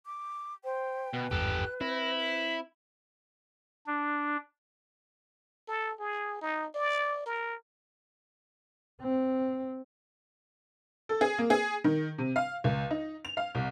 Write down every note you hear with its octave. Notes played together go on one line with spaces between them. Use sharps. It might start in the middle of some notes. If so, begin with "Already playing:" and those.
D6
C5 G5
B2 B4
G#1 E2 G2 G4 A4 F#6
C4 E4 A#6
B6
D4
A4
G#4
D#4
D5
A#4
C4
A4
G#4
A#3
G#4
D#3
C3
F5
C#2
D#4
F7
F5
C2